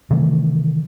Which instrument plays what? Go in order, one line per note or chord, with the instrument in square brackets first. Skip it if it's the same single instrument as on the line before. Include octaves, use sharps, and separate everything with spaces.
[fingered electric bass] C3 D#3 E3 A3